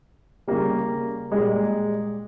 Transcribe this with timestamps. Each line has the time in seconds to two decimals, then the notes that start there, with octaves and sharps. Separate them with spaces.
0.48 C#3 G3 A#3
1.32 A#2 G3 G#3